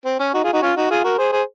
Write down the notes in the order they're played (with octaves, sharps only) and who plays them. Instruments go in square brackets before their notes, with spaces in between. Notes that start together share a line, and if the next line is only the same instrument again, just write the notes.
[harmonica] C4
C#4
D#4 F#4
F4 G#4
D#4 F#4
C#4 F4
D#4 F#4
F4 G#4
F#4 A#4
G#4 C5
G#4 C5